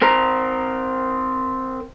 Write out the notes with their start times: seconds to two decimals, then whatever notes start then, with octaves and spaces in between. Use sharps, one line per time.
0.02 C4 A#4 C5 A#5